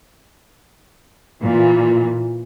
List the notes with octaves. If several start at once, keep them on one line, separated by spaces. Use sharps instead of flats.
A#2 E3